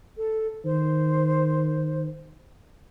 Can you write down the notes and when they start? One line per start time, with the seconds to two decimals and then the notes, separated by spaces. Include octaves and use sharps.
0.17 A4
0.65 D#3 C5